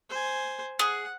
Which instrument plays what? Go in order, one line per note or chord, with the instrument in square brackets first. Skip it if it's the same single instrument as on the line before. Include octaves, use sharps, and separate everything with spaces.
[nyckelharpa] C5 G#5
[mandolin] G#4 [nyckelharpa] F#5